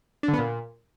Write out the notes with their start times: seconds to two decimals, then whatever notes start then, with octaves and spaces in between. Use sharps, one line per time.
0.23 D4
0.28 D3
0.33 B3
0.39 A#2